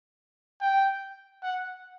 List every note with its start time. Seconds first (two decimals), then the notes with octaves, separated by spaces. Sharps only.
0.61 G5
1.43 F#5